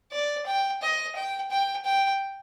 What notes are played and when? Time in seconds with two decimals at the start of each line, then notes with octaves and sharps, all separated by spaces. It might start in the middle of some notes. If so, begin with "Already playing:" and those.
0.12 D5
0.46 G5
0.82 D#5
1.16 G5
1.51 G5
1.85 G5